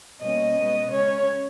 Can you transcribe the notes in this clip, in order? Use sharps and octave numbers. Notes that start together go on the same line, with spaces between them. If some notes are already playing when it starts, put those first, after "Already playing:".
B2 G3 A#3 C#4 D#5
B2 G#3 B3
C#3 G#3 C#4 C#5